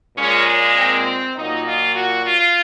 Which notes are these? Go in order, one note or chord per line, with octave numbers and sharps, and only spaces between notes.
A#2 G#3 C#4
C4
A#2 F#3 A#3 D#4
F4
F#4
F4